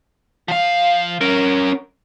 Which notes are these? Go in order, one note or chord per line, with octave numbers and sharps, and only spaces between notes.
F3 F5
C#4 A#4